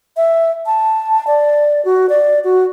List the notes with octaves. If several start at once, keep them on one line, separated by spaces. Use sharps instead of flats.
E5
A5
D5
F#4
D5
F#4